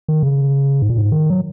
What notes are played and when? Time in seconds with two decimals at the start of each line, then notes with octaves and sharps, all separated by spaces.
0.08 D#3
0.23 C#3
0.82 G#2
0.90 A#2
0.97 G#2
1.12 D#3
1.30 F#3